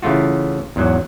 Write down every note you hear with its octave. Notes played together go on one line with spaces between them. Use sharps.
C#3 E3 A3 F4 F#4
E2 G#2 F#3